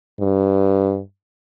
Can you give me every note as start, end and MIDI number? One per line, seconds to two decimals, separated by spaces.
0.20 1.00 43